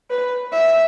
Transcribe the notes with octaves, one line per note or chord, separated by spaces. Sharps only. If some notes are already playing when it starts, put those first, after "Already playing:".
B4
E5